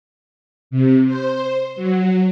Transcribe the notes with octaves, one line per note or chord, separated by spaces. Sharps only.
C3
C5
F#3